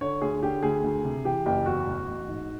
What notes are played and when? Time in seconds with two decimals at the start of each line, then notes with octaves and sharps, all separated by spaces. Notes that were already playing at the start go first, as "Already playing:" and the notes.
0.01 D3 C#5
0.22 D2 G#4
0.42 D3 G4
0.63 D2 G#4
0.84 D2
1.04 C3
1.25 E3 G4
1.46 F#1 G4
1.66 E2 F#4
1.87 A1
2.07 A1
2.28 G#2